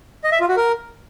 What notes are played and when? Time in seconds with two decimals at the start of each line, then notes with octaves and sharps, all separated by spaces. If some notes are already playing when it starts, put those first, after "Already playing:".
0.24 D#5
0.32 E5
0.40 F4
0.49 F#4
0.57 A#4